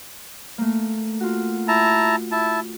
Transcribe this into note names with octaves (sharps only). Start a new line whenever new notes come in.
A3 A#3
F4 F#4
E4 A5 A#5
E4 A5